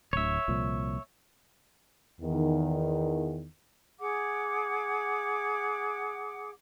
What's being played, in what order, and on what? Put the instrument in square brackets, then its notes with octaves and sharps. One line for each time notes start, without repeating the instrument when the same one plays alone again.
[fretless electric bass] D1 D2 [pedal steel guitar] C#5 E5
[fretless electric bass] C2 A#2 F3
[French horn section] E2 D#3
[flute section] G#4 F#5 D6